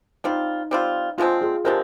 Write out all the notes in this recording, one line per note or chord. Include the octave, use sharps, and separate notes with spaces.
G3 C4 D#4 F4
G3 C4 F4
D3 F3 G#3 C4 F4
F4 G#4
D3 F3 G#3 C4 G4 A#4